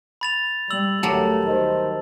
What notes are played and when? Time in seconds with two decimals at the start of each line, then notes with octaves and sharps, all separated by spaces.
0.21 B5 A6 F7
0.71 G3 E6 F#7
1.03 D2 F#3 G3 A3 A#4 A5
1.47 D#3 C5 D#5